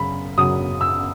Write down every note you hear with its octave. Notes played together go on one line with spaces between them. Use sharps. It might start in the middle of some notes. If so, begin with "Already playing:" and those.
Already playing: F#2 C#3 B5
F#2 C#3 F#3 D#6
E6